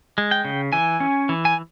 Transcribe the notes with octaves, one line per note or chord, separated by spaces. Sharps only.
G#3
G5
C#3
E3 G#5
C#4
E3
G#5